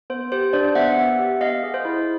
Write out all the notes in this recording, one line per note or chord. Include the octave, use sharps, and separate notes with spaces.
B3 C5
G4 C5
D4 C5 D5
B3 E5 F#5
B3
G4
B3 D#5 F5
G#4
C5
E4